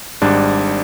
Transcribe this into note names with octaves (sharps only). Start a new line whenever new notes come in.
G#1 G#2 G3 D4